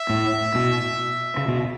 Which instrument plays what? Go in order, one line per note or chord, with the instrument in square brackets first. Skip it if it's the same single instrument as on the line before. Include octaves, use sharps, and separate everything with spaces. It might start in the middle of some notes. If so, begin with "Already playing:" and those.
Already playing: [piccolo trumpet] E5
[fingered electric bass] A2
B2
C#3
B2